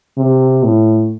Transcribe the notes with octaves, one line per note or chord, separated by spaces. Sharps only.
C3
A2